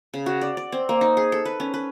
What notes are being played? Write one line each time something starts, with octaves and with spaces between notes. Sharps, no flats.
C#3
F#4
D5
D5
C4
A#3
D#4
G#4
A4
B4
C#4
B4